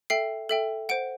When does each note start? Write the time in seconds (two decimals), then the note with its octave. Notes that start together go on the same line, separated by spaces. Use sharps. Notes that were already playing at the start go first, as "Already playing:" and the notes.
0.10 A4 E5 G5 C7
0.49 A4 E5 G5
0.89 C5 F#5 D7